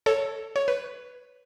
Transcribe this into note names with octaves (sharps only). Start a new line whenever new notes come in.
A4 C#5
C#5
B4